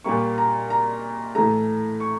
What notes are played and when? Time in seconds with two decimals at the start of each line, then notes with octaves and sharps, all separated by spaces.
0.04 A#2 G3 A#3 C#6
0.38 A#5
0.70 A#5
1.35 A2 E3 A3 A#5
2.00 C#6